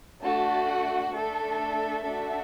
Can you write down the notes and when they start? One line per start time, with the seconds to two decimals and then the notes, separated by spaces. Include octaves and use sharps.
0.22 A3 D4 F#4 A5
0.68 F#5
1.13 A3 D4 A4 E5
2.04 A3 D4 F#4 A4